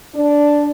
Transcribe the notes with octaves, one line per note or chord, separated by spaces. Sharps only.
D4